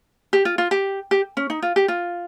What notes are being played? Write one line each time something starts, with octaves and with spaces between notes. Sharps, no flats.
G4
F4
F4
G4
G4
C#4
D#4
F4
G4
F4